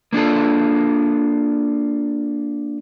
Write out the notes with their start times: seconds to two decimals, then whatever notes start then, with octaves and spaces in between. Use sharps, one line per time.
0.13 A#3 D4 F4 A4